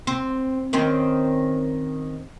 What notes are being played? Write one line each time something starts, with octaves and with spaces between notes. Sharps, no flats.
C4
D#3 C4 C#4